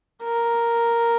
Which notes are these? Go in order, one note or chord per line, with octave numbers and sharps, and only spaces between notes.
A#4